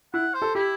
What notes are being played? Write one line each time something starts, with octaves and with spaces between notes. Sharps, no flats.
E4 F#5
C5
A4
E4 G4